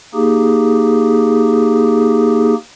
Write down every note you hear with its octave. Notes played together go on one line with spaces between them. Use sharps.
A#3 D#4 G4 G#4